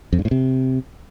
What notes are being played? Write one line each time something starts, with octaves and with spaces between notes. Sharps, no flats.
F2
G2
A2
C3